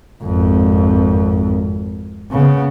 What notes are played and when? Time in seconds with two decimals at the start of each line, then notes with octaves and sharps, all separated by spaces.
0.23 G#1 F2
2.31 C#3 B3